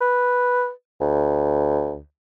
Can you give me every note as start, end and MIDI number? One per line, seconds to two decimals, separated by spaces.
0.01 0.71 71
1.01 2.00 38